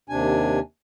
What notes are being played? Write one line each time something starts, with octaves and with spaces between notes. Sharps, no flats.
D#2 C3 D4 G#5